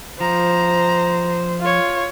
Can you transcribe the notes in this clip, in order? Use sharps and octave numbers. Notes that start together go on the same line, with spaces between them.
F3 C5 A#5
F4 C#5